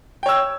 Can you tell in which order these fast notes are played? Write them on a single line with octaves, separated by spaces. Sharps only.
G5 C#5 E6